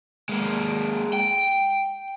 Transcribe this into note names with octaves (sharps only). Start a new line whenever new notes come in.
G#3 A#3
G5